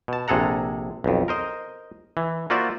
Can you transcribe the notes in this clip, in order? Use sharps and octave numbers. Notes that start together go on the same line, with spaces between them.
B2 A5
A#1 C3 G#4 A4 F#5 A#5
B1 F2
A#4 C5 D#5
E3
A#3 F4 F#4 C5 D5 E5